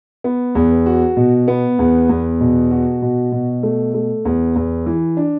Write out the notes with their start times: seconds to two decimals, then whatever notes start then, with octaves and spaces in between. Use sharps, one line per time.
0.24 B3
0.55 E2
0.86 F#4
1.17 B2
1.48 B3
1.79 E2
2.09 E2
2.40 B2
2.71 F#4
3.02 B2
3.32 B2
3.63 A3
3.94 A3
4.25 E2
4.56 E2
4.86 E3
5.17 D4